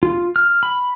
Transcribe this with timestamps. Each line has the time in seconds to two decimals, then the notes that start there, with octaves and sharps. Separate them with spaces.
0.03 F4
0.36 F6
0.63 B5